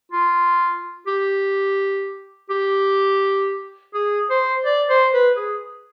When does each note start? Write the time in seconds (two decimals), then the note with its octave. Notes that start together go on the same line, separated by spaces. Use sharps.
0.12 F4
1.07 G4
2.50 G4
3.94 G#4
4.30 C5
4.65 D5
4.90 C5
5.14 B4
5.36 G#4